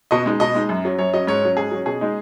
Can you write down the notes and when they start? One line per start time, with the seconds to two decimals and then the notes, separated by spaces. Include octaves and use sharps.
0.11 B2 D#5
0.26 G#3 D#4
0.40 B2 D#5
0.55 G#3 D#4
0.69 F#2
0.85 F#3 C#4
0.98 F#2 C#5
1.14 F#3 C#4 D#5
1.27 G#2 C#5
1.43 F#3 C#4
1.57 G#2 G#4
1.71 F#3 C#4
1.86 B2 G#4
2.01 G#3 D#4